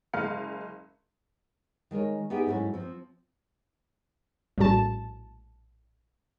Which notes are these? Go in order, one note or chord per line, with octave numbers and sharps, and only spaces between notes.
F#1 G#3 F5 C#7
D#3 G#3 A#4 C#5
B3 D#4 G4 G#4 E5 G5
G#2 F#3 A3 C#4 E4
F3 C4
A#1 A2 G3 C#4 F#4 A5